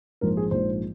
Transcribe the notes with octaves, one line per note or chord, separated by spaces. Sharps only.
A#1 G#2 F3 A#4
G#4
A#1 G#2 F3 C5